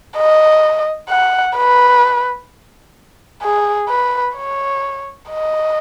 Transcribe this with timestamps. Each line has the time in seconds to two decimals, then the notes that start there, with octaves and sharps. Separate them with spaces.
0.18 D#5
1.10 F#5
1.57 B4
3.43 G#4
3.89 B4
4.36 C#5
5.29 D#5